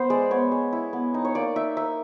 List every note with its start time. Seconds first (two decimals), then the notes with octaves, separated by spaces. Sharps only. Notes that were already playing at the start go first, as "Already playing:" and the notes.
Already playing: B3 C5
0.10 G#3 D5
0.31 B3 C#5
0.52 G#3
0.73 E4
0.93 B3
1.14 D#4
1.25 C#5
1.35 A#3 D5
1.56 D#4 E5
1.77 D#4 E5